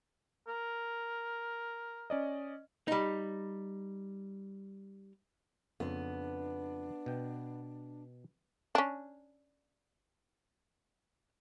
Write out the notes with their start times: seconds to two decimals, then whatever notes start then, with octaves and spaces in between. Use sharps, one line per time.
0.48 A#4
2.10 C#4 D5 D#5
2.88 G3 D#4
5.80 F2 C#3 B3 D4
7.06 B2 G5
8.75 C#4 D4